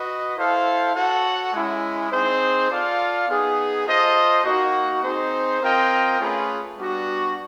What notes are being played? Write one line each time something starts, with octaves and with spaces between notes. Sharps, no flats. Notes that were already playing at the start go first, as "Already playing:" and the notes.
Already playing: F#4 B4 D#5
E4 A4 C5 F5
F#4 A4 C#5 F#5
G#3 C#4 E4
C4 D#4 G#4 C5
F4 A4 D5 F5
B3 D#4 G#4
F4 A4 C5 D#5
A#3 D#4 F#4
C4 D#4 G#4 C5
C4 F4 A#4 D#5 G5
A3 C#4 F4 G#4 B4
G3 B3 D4 F#4